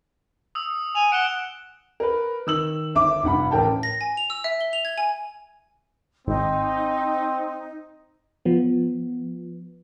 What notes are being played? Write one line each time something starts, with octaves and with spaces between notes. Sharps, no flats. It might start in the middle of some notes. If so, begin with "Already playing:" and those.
D#6 E6
G#5 F7
F#5 D7 E7 G7
A#4 B4
D#3 E6 F#7
G1 E5 D6
F1 G2 F#5 B5
A1 A#4 G5 A5
A#6
G#5
F7
E6
E5
G7
F7
G#6
G#5
G#1 C4 D#4
F3 B3